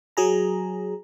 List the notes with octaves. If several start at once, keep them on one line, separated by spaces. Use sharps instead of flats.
F#3 G#4 A#5